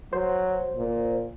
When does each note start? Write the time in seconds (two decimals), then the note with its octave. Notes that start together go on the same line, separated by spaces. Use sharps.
0.13 F#3 C5
0.76 A#2